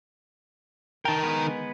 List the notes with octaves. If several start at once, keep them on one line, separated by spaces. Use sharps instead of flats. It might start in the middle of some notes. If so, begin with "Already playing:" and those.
D#3 A#4 G5 A5
G#3 B3 B4